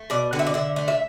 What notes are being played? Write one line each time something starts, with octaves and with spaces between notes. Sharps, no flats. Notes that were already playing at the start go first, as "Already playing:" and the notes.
Already playing: A3
B2 D5
D3 F#5
E5
D5
D3 E5
A3
E5